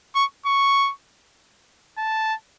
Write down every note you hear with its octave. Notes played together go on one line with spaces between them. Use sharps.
C#6
C#6
A5